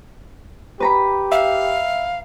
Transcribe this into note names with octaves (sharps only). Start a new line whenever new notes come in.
G4 B4 A#5 B5
E5 F5